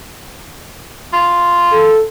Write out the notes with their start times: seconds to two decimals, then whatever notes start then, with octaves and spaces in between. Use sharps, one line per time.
1.13 F4
1.73 A4